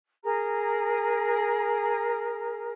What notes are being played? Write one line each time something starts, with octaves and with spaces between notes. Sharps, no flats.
G#4 A#4 A#5